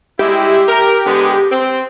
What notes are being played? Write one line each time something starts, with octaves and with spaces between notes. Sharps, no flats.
G3 G#3 E4 G4
A#4
D3 G#3 B3
C4